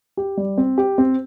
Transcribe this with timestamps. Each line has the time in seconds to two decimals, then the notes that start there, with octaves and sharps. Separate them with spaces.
0.17 G4
0.37 G3
0.58 C4
0.78 G4
0.98 C4